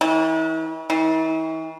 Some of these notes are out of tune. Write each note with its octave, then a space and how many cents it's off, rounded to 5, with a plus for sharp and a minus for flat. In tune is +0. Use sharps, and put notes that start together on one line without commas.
E3 -40
E3 -45